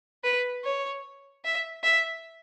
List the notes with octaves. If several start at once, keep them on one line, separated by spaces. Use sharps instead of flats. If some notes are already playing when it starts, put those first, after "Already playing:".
B4
C#5
E5
E5